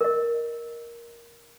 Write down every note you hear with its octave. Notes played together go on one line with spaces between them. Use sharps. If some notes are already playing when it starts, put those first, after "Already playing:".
A#4 D#5